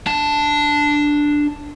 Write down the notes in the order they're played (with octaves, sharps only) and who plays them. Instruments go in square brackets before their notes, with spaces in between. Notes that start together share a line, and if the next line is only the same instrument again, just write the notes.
[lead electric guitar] D4 A5